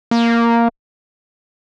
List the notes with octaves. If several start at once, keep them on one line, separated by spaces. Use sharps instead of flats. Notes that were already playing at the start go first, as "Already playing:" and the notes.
A#3